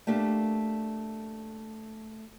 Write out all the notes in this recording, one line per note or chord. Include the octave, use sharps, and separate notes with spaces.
A3 A#3 D4 G4